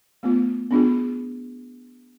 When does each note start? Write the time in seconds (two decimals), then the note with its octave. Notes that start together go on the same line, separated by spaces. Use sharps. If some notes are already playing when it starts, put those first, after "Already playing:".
0.23 A3 B3 F4
0.71 B3 D4 F4 G#4